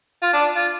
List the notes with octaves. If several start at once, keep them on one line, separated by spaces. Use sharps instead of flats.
F4
D4
F4